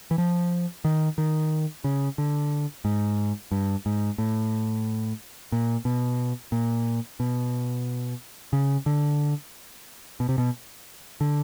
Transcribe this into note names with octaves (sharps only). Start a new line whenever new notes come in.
E3
F3
D#3
D#3
C#3
D3
G#2
G2
G#2
A2
A#2
B2
A#2
B2
C#3
D3
B2
C3
B2
D3